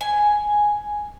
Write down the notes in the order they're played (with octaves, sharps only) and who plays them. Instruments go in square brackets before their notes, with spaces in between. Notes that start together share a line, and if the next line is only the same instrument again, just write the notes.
[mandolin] G#5